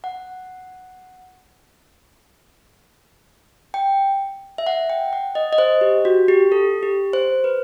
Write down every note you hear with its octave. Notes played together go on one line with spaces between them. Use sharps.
F#5
G5
E5
F#5
G5
F#5
D#5
D#5
C5
G4
F#4
G4
A4
G4
C5
B4